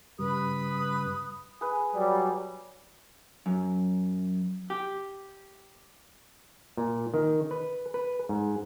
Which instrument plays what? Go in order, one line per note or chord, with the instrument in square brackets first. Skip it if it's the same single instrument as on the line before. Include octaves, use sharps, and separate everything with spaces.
[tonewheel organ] G2 C#3 G3 [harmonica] B4 [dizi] D#6
[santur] G#4 B4
[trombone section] F#3 G3
[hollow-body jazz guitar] F#2
G4
[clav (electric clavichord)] A#2
D#3
B4
B4
G#2